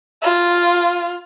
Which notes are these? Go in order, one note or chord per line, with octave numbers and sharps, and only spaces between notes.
F4